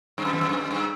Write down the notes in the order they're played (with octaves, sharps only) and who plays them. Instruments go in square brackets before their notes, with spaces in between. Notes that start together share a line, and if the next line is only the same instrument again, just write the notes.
[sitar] G2
F#2
E2
F#2
G2
F#2
G2